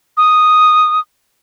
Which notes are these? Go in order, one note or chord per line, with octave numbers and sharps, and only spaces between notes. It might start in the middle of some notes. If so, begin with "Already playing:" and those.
D#6